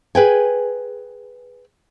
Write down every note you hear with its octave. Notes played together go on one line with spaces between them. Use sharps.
G#4 B4 G5 G#5